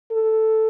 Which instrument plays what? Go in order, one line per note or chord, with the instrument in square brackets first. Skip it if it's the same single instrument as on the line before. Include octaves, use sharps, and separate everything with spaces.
[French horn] A4